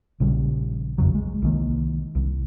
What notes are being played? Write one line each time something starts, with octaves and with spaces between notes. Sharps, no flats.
A#1 C#3 G3
F#1 F2 C#3 F#3
G#3
C2 D#3 A#3
C2